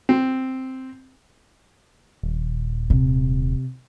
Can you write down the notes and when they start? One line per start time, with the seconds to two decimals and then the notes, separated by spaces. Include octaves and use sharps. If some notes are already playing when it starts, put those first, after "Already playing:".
0.09 C4
2.23 D#1
2.90 C3